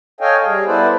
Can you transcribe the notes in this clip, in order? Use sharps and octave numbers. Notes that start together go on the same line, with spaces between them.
A4 C#5 D#5 F5 G5 G#5
G3 G#4
B3 E4 A4 B4 C5 D5